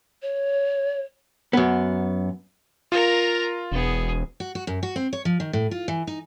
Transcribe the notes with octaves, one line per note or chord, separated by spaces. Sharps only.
C#5
F#2 B3
F4 A#4 A#5
E1 B3 G#4
F#4
F#4
F#2
F#4
C4
C#5
F3
D#3
A2
F4
E3
D#4